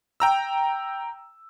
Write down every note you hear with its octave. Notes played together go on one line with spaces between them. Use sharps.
G5 A#5 E6